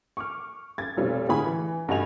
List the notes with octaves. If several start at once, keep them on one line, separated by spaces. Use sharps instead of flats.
C#6 D6 F6
G#6 A6
F1 B1 G3 C4
A2 D3 G#4 F5 G#5 B5
E3
F1 G2 F#4 D#5 G#5 F7